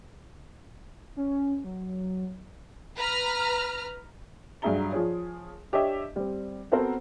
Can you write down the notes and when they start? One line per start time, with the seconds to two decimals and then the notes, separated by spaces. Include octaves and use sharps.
1.16 C#4
1.64 F#3
2.96 B4 A#5 F6
4.62 G2 F#3 G#4 E5 A#5 G7
4.92 F3 G#4 C#5
5.72 D4 G4 C#5 D#5 E5
6.16 G3 C4
6.72 B3 C4 F#4 A4 A#4 C5